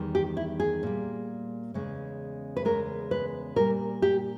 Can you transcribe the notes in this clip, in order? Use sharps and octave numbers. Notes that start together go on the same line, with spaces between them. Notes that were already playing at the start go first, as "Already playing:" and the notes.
Already playing: E2 D#3 G3
G4
E4
G#4
A#2 G3
E2 C#3 G#3
B4
E2 C#3 G#3 A#4
B4
A#2 G3 A#4
G4